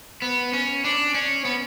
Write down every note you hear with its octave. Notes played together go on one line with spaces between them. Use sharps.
B3
C#4
D4
C#4
B3